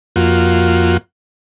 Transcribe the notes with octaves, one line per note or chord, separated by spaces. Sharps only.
F2 A#3 F4 F#4